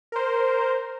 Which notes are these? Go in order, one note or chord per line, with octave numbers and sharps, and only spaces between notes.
A#4 C5